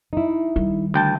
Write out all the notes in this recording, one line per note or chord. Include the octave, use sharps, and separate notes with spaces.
D#4 E4
D#3 G3
D2 G5 A5